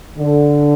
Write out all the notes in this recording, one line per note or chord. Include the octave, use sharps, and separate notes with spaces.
D3